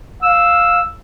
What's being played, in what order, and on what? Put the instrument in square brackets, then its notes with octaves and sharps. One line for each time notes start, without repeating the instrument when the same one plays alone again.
[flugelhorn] F5 [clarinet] E6